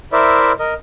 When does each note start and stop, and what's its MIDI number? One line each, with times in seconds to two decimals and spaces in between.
0.13 0.52 64
0.13 0.52 70
0.13 0.52 72
0.13 0.52 74
0.13 0.52 76
0.59 0.74 70
0.59 0.74 75